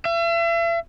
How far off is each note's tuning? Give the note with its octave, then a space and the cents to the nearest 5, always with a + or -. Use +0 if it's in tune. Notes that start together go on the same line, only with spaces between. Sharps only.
E5 +40